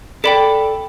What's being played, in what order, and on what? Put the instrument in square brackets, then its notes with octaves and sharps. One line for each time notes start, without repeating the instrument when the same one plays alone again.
[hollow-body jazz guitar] A4 D5 [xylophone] G5 B5 B6